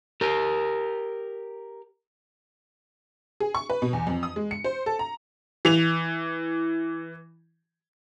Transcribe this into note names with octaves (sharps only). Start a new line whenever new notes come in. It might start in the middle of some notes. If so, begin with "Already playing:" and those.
G4 A#4
G#4
C#6
B4
B2
E2
F2
D#6
G#3
C#7
C5
A4
A#5
E3 F7